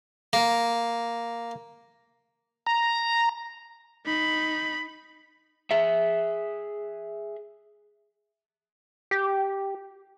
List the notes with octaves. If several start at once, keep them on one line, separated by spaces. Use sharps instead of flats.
A#3
A#5
D#4 B5
G#4 E5
G4